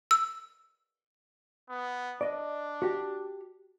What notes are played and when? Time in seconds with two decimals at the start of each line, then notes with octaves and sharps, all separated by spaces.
0.11 E6
1.69 B3
2.21 D4 D5 D#5
2.82 F#4 G4